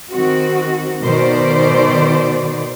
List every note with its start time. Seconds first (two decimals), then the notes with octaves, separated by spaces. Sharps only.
0.12 D#3 C4 F#4
1.02 B2 D#3 C5 D5